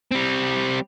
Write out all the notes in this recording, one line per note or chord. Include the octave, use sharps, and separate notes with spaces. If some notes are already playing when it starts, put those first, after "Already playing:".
G3 C4